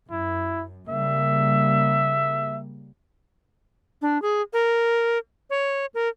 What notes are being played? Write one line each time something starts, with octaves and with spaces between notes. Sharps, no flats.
F#2 E4
C#3 G3 A#3 E5
D4
G#4
A#4
C#5
A#4